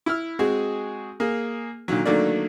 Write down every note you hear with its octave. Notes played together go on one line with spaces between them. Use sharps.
E4 E6 F6
G#3 C4 F#4 G#4
A#3 G#4 A#4
A#2 D3 D#3 F#3
D3 D#3 F#3 A3 A#3 D5